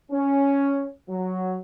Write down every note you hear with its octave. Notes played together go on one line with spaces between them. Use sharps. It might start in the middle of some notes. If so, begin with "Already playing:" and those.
C#4
F#3